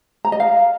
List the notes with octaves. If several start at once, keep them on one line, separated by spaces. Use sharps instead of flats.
A#5
D#5
F5